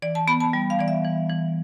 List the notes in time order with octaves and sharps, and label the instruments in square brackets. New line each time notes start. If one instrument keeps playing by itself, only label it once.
[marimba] E3 D5
A5
B3 B5
A5
G3
F5
E3 D5
E5
E3
E3